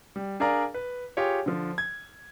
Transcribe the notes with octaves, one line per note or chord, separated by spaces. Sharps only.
G3
D4 G#4 A#4 D5 F5 A#5
B4
F4 G4 G#4 C#5
D3 F3
G#6